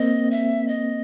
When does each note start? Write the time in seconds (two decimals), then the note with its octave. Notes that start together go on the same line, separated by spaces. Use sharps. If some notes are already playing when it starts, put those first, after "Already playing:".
Already playing: A#3 C4 D#5
0.31 E5
0.68 D#5